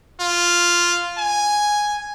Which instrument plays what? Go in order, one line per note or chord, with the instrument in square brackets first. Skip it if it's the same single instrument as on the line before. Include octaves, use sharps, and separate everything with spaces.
[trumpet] F4
G#5